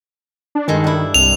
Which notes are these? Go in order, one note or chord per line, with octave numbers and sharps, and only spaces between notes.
D4
G2 D#3 G#3 A4
D4 E4
C2 F7